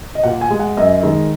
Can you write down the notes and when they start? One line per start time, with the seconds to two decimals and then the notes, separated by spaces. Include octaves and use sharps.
0.15 D#5
0.24 A#2 F#5
0.41 G#5
0.50 G#3
0.60 F#5
0.77 F#2 D#5
1.03 D#3 G#3